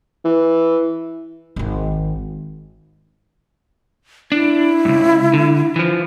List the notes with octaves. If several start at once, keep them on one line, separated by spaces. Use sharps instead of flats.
E3
G#1 D#3
D4 E4
C#2 G2
D3
E3 F3